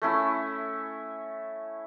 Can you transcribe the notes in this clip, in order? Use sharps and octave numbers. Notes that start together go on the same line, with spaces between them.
A3 C#4 E4